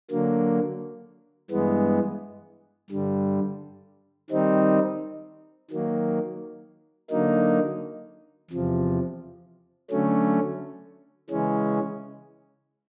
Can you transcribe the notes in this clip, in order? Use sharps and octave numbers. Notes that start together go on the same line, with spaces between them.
D3 F#3 A#3
G2 E3 G#3 B3
G2 D3 G3
D#3 G3 C4 D#4
D#3 F#3 A#3
D3 F#3 A#3 D#4
E2 C3 F3
D3 F#3 A3 C#4
C#3 E3 G#3 C#4